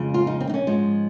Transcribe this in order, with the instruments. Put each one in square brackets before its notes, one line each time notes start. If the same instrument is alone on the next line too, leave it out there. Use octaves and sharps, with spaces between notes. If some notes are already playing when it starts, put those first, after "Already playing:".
Already playing: [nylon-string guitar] F2 C#3 G#3
F4
D#4
C4
D#4
C#4
G#2 F3 G#3